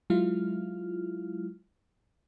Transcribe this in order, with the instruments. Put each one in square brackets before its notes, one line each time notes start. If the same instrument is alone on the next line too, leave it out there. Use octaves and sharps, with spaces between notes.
[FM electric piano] F#3 G#3 E4 F4 F6